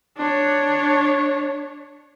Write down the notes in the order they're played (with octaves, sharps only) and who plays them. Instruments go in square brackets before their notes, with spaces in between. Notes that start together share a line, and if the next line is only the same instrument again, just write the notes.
[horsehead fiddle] D4 C#5